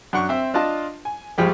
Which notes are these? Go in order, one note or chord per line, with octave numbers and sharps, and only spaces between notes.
F#2 D4 F#5 C#6
C4 C5 E5
D4 F4 D#5 A5
G#5
A#1 F3 G3 G#3